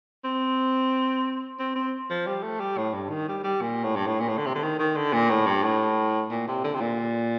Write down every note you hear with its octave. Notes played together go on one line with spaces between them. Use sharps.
C4
C4
C4
F3
G3
A3
G3
A2
G2
D#3
G3
G3
A#2
A2
G2
A2
A#2
A2
D3
C3
D3
D#3
D#3
D3
A#2
A2
G2
A2
A#2
C3
D3
C3
A#2